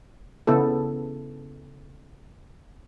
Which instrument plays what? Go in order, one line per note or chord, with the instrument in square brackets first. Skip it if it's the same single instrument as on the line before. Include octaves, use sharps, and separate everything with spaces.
[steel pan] C#3 B3 E4 A4